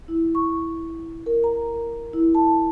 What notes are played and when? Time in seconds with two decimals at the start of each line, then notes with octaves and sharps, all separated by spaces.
0.08 E4
0.35 C#6
1.26 A#4
1.44 A#5
1.74 A#4
2.13 E4
2.35 A5